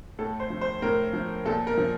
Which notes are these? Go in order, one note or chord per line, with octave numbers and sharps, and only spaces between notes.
A2 A4
C5
F3
C5
A2 A#4
F3
A#2 A4
A#4
F3